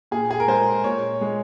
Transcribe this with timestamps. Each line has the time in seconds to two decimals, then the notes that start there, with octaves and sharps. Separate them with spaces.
0.11 A#2 G#4
0.31 G#4
0.40 A#4
0.48 G#3 C5
0.84 A#2 C#5
1.21 G#3